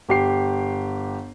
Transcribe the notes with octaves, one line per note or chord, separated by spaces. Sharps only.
G1 G4 C7